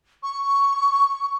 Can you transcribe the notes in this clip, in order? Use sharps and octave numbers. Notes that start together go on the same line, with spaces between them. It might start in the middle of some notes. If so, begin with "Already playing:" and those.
C#6